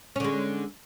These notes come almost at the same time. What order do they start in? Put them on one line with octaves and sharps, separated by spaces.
C#4 D3 G#3